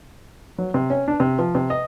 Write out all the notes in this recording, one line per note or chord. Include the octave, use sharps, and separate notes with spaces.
F#3
C3
C#4
D4
C3
F3
C3
D#5